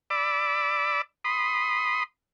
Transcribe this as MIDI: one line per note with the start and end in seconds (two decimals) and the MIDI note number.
0.10 1.02 74
0.10 1.02 83
0.10 1.02 86
0.10 1.02 88
1.24 2.03 83
1.24 2.03 84
1.24 2.03 87